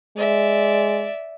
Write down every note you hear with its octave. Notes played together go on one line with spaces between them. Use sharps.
G#3 D5 E5